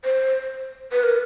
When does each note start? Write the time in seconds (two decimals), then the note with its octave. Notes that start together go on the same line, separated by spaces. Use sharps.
0.05 C5
0.92 B4
1.03 A#4